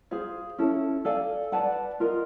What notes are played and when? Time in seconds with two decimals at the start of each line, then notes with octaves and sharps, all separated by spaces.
0.11 G#4 C5 F5
0.58 C#4 E4 A4
1.05 A4 D5 F5 G#5
1.52 B4 D5 F#5 A5
2.00 F4 A#4 D#5